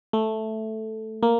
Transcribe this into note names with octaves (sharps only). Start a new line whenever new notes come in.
A3
A#3